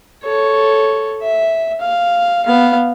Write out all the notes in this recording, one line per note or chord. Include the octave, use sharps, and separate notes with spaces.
A4 C#5
E5
F5
B3 F5